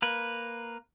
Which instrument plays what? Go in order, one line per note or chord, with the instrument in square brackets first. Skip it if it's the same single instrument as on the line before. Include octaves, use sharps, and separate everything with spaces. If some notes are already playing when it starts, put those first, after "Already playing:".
[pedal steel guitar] A#3 B4